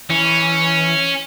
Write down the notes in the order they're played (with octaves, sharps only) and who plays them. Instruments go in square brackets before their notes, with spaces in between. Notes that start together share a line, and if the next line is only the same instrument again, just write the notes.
[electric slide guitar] E3 [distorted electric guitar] C#4